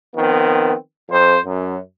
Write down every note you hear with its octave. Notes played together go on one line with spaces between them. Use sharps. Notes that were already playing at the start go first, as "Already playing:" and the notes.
D#3 F3 B3 C4
F2 C5
F#2